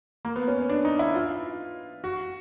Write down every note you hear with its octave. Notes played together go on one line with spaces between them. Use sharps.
A#3
B3
C#4
C#4
D4
D#4
E4
F4
F#4